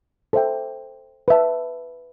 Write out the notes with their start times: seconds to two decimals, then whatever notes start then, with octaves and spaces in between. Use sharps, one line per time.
0.33 A4 C5 E5 G5
1.28 B4 E5 A5